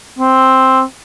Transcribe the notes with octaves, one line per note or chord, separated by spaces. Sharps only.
C4